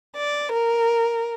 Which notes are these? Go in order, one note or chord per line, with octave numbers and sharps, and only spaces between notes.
D5
A#4